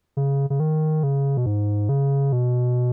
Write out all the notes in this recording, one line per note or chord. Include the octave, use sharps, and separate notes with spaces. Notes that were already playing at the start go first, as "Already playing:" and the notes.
C#3
C#3
D#3
C#3
B2
G#2
C#3
B2